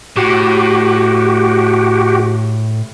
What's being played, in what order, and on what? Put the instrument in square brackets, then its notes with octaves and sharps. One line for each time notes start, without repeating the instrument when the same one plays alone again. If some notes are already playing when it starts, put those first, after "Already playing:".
[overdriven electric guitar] A2 [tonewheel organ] F#4 G4